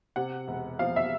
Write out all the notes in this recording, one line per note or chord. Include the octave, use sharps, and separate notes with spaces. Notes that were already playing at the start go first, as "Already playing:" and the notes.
C3 F#5
E1
F3 F5
E5